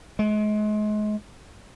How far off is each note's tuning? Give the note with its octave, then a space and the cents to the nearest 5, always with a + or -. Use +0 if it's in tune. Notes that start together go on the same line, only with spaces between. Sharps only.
G#3 +35